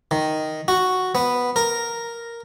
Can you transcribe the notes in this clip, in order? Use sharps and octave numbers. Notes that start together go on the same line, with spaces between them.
D#3
F#4
B3
A#4